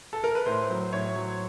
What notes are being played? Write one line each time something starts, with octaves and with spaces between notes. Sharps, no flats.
A4
A#4
B4
A2 C5
F#3
A2 C#5
F#3